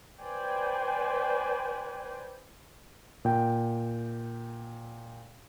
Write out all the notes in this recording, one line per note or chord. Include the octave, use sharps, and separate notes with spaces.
B4 C5 D5 G5 G#5
A#2 G5